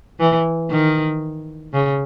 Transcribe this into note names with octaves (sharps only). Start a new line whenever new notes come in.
E3
D#3
C#3